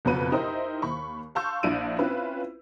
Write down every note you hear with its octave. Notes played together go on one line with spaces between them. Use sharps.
F#1 F2 B2 F#4 B4 D#7
D#4 E4 G4 A#4 C5 D#5
D#2 B5 C#6
F5 A5 C6 C#6 E6 G6
A#1 D4 E4 F4 D7 D#7
C4 C#4 E4 F4 B4